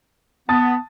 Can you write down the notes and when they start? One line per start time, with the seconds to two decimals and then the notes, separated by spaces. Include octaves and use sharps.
0.49 B3 A5 D#6 A6